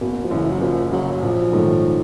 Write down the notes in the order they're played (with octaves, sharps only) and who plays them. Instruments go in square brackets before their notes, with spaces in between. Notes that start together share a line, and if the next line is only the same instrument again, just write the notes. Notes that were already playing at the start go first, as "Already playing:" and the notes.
[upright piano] F#1 [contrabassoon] B2
[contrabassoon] F3
[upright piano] F#2 C#3 [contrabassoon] E3
[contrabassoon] F#3
[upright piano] F#1 [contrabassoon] F3
[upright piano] F#2 C#3 [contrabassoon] F#3
[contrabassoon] F#3
[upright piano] A#1 [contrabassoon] F3
[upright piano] G#2 D#3 F#3 A3